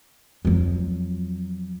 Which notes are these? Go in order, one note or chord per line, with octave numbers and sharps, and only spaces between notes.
F2 F#3